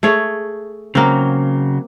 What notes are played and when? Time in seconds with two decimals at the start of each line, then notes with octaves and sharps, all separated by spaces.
0.03 A3 G#4 C#5
0.95 C#3 F#3 A#3 C4